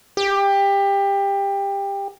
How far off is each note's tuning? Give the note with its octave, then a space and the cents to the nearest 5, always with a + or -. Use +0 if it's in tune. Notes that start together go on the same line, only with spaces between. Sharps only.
G4 +20